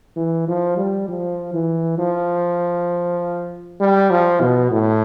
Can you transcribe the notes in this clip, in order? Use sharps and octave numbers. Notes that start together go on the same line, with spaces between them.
E3
F3
G3
F3
E3
F3
G3
F3
B2
A2